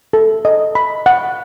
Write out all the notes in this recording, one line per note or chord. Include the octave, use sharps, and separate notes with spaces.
A4
D#5
B5
F#5